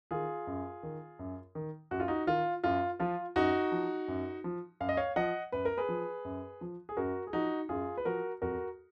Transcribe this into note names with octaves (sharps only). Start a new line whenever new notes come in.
D#3 F4 G#4
F#2
D#3
F#2
D#3
F#2 F#4
F4
D#4 F#4
D#3 F4
F#2 F4
F3 F4
F#2 D#4 F#4
F3
F#2
F3
F#2 F5
D#5
C#5 F5
F3 D#5 F#5
F#2 B4
A#4
G#4 B4
F3
F#2
F3
G#4
F#2 F#4 A#4
G#4
F3 D#4 F#4
F#2 F4 G#4
B4
F3 F#4 A#4
F2 F#4 A#4